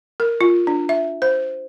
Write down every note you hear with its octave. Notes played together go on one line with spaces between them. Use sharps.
A#4
F4
D4
E5
C5